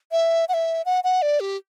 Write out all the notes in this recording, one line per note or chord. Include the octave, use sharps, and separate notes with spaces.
E5
F#5
E5
F#5
F#5
D5
G4